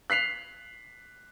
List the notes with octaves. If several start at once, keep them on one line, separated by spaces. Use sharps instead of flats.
F#6 B6 C7 F7